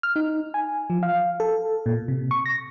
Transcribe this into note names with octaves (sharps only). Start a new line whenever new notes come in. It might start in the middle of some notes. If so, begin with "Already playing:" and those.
F6
D#4
G#5
F3
F5
A4
A#2
C3
C#6
A#6